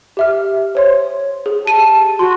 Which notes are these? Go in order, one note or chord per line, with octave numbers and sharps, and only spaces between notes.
G4 E5 F6
C5 C#5 C6
G#4
G4 A5 D#7
F#4 C6